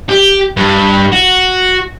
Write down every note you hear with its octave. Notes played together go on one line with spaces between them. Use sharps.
G4
G2
F#4